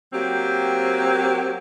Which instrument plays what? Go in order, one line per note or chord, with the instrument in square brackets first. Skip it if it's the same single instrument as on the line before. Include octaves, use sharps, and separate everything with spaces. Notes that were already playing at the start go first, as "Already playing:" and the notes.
[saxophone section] F#3 A#3 C4 G4